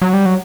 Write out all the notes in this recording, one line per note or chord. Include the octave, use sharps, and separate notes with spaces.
F#3
G3
F#3